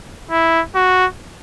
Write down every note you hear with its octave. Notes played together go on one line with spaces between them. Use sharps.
E4
F#4